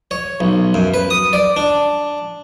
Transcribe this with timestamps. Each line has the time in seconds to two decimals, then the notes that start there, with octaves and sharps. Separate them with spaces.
0.11 C#5
0.40 B1
0.74 F#2
0.94 B4
1.10 D#6
1.33 D5
1.56 D4